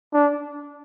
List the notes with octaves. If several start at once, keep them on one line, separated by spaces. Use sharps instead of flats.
D4